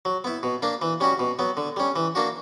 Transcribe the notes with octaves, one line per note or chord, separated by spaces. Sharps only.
F#3
B3 E4
B2
A#3 D4
E3
G3 C#4 F#4
B2
F#3 B3
D3
G3 C#4
E3
A#3 D4 F#4